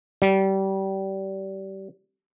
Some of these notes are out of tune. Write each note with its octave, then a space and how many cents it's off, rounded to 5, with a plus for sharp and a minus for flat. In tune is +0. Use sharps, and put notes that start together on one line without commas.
G3 -25